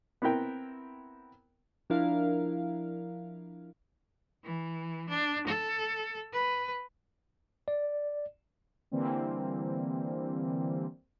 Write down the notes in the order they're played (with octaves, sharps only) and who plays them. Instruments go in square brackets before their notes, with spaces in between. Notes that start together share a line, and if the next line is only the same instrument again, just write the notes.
[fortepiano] B3 C4 E4 A#4 G5
[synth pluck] F3 D4 E4 A#4 F5
[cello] E3
D4
A4
B4
[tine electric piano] D5
[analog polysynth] D3 E3 G3 A#3 C4